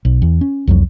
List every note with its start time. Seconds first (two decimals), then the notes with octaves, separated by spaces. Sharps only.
0.05 B1
0.22 E2
0.41 C#4
0.67 C2 F2 F#3